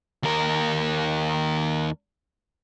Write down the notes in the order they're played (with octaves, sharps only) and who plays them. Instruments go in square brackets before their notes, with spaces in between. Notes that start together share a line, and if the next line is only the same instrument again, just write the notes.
[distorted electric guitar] D#2 A#4